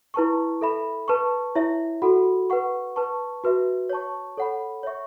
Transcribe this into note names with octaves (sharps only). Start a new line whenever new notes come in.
E4 B4 A5 C#6
A4 E5 B5
B4 A5 C#6
E4 C#5 E5
F#4 A4 F#5 B5
B4 F#5 C#6
B4 A5 C#6
F#4 B4 E5
C#5 A5 C#6
A4 C#5 F#5 B5
C#5 E5 C#6